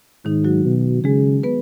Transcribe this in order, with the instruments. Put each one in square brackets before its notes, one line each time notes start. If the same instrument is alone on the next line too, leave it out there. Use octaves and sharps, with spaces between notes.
[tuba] G#2 [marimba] D#3 D#4
[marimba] F#3 F#4
[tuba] B2
[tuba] C#3 [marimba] G#3 G#4
[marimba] B3 B4